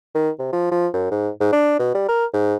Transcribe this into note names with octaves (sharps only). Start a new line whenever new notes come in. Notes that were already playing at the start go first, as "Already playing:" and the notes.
D#3
C3
F3
F3
F#2
G#2
G#2
D4
B2
G3
A#4
G#2